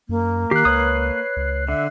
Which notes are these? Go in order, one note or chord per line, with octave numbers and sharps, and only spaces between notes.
F#2 A#3
D#3 G4 F#6 C7
C#2 B4 C#5 D#6
C#2
D3 E5